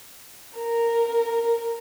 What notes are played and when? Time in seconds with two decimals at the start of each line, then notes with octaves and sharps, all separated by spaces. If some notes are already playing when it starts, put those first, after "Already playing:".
0.57 A#4